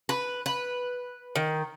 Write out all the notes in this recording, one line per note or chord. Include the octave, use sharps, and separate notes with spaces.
B4
B4
D#3